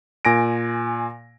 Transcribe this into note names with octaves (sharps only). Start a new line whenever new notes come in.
A#2 G#5 A#6 D7